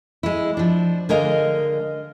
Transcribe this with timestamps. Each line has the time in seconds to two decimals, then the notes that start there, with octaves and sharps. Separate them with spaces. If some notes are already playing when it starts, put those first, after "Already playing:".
0.23 G#3 E4
0.57 F3 D4
1.09 D3 G#3 A#4 D#5 F5